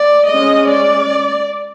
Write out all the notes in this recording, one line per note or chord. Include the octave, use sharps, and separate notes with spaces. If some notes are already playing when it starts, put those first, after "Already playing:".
Already playing: D5
G#3 C#4 D#5
D5